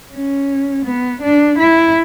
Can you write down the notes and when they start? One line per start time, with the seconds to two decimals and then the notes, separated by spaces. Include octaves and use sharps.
0.14 C#4
0.86 B3
1.22 D4
1.59 E4